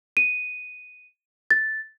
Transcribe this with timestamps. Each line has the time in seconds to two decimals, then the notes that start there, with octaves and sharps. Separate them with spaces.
0.17 D#7
1.51 A6